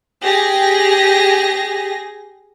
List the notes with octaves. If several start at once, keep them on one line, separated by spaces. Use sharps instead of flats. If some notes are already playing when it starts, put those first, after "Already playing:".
G4 G#4 A#6